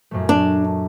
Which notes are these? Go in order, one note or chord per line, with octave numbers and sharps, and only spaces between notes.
F#2 A#2 A3
D4